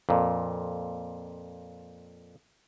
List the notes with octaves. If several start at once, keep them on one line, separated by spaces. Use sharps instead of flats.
F2 A#2